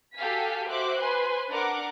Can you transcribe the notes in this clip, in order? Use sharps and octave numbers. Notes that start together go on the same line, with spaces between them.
F#4 G4 A4 F5 G#5 B6
F#4 C5 E5 D6 F#6
B4 C5 G#5 C6
D4 A#4 F#5 D6